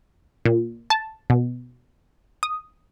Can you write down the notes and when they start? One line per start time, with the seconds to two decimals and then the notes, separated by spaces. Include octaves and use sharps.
0.45 A#2
0.90 A5
1.30 B2
2.43 D#6